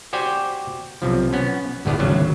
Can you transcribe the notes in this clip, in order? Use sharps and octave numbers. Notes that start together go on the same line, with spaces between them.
F#4 G4 C5 D5 G5 G#5
B1 C3 F3
B3 C#4
G1 D2 A2 B3 G#4 D5
G#1 D2 C#3 F#3